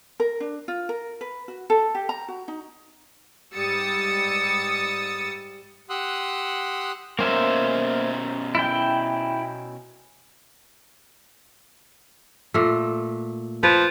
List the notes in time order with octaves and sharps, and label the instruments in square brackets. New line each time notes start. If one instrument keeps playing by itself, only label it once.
[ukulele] A#4
D4
F4
A#4
B4
F#4
A4
G4
A#5
F#4
D#4
[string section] G#2 G3 D#6 E6 A6 C#7
[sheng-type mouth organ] G4 F#5 C6 D#6 E6 F#6
[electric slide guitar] B2 C#4 A#4 [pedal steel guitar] A#3 C5 E5
[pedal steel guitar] E4 G5
[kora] A#2 A3
[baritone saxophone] F3 [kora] B4